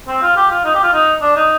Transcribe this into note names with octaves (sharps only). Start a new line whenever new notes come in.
C4
F4
G4
F4
D#4
G4
F4
D#4
D4
D#4